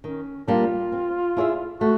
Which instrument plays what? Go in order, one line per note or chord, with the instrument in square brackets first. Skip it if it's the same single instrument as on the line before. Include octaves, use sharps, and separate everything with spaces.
[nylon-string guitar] D#3 [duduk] C#4
[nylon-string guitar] G3 A#3 D4 [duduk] F4
[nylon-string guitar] C4
E4 G#4 C#5 E5
[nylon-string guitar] A3 [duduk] F#4